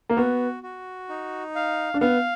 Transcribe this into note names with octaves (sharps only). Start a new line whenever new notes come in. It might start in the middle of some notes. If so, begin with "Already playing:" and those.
A#3
B3 F#4
F#4
D#4
F5
D4
B3 F5